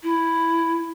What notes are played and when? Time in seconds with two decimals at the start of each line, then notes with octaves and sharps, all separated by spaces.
0.03 E4